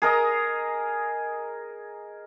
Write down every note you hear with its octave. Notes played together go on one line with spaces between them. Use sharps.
G#4 A#4 D#5 A#5